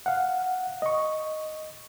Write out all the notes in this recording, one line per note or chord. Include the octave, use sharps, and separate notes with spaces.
F5 F#5
D#5 C#6